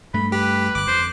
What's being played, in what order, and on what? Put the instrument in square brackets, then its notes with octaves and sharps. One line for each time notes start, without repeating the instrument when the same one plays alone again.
[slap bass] G2 A3 [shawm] B5
[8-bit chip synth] G4 [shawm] B4
[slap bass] G1 [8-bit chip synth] D6 F#6
[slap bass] F2 [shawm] C5